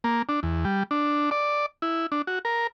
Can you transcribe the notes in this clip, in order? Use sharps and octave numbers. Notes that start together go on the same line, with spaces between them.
A#3
D4
E2
G3
D4
D5
E4
D4
F#4
A#4